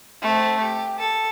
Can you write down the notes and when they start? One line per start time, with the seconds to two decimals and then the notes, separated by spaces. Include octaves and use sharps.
0.22 A3 C4
0.60 G4
0.99 A4